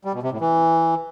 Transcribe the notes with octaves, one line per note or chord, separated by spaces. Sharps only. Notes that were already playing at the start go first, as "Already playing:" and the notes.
G3
B2
C3
A2
E3